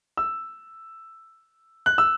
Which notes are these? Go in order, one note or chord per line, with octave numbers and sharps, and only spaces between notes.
E6
F#6
E6